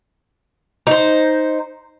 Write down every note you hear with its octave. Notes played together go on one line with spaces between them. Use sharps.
D#4 C5